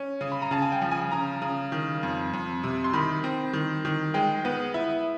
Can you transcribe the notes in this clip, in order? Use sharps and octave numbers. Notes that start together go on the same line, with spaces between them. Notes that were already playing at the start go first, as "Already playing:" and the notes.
Already playing: C#4
C#3
B5
A#5
C#3 A5
G#5
G5
F3
G#5
C#3 A#5
C#3
D#3
F2
F2
C3
C6
D#3 B5
C4
D#3
D#3
G#3 G5
B3
E4